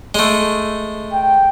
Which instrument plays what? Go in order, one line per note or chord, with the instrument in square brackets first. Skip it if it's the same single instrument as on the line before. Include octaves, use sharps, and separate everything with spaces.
[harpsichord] G#3 A3
[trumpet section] G5